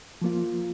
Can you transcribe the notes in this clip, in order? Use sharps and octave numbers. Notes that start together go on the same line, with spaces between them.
F3 A#3 F4